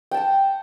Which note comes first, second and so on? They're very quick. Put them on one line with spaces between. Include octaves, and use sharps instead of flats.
G5 A5 F#5